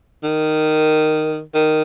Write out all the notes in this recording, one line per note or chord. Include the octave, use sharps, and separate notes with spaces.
D#3
D#3